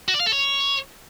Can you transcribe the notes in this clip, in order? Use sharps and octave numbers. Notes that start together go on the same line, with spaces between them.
F#4
D5
F5
A4
C#5